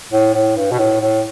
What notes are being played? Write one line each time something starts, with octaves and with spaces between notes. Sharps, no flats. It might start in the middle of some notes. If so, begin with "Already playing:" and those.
A2
A2
G2
B2
A2
A2